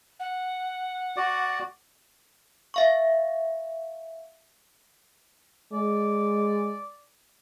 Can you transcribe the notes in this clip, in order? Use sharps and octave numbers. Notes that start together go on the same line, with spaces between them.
F#5
F#4 D5
E5 F5 C#6
G#3 D5